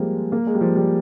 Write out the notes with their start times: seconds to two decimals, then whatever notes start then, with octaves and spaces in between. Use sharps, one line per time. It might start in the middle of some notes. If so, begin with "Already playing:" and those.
Already playing: F3 G3 G#3 A#3 C4
0.32 A#3
0.47 G#3
0.55 G3
0.61 F3
0.76 G3